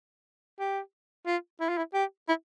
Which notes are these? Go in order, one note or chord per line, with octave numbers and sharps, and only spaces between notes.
G4
F4
E4
F4
E4
G4
E4